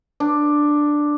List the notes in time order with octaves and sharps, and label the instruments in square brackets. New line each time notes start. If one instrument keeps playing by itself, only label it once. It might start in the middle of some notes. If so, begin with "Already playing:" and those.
[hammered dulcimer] D4